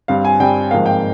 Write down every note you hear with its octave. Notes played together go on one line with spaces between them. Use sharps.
G2 G3 C4 F5
G#5
G2 G3 C4 G5
G#1 G#2 F3 A#3 F5
G5